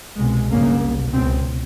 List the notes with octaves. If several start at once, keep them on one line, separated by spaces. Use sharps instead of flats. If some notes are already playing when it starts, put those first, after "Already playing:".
C2 B2 G#3
G1 F#2 C#3 A#3
C2 B2
C#2 B2 C4